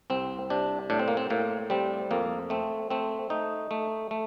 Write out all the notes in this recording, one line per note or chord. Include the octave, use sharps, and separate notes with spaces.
C2 C4
C3 D4
A2 D4
C4
A#3
C4
A2 A#3
G3 C4
F2 A#3
A3 C4
A3 C4
A3 D#4
A3
A3